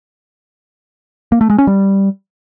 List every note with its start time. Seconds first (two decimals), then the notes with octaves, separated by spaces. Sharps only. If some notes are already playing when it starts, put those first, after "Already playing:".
1.32 A#3
1.41 A3
1.50 G#3
1.58 C#4
1.67 G3